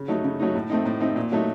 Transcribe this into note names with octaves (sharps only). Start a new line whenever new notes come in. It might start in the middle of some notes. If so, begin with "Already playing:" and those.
Already playing: C#3
F#3 A3 D#4
C#3
F#3 A3 D#4
A2
A3 C4 D#4
A2
A3 C4 D#4
A#2
F#3 A3 D#4